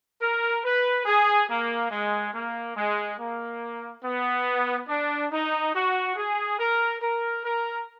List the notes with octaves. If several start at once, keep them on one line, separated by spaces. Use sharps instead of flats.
A#4
B4
G#4
A#3
G#3
A#3
G#3
A#3
B3
D4
D#4
F#4
G#4
A#4
A#4
A#4